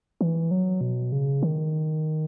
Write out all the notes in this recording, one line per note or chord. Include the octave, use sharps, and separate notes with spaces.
E3
F#3
B2
C#3
D#3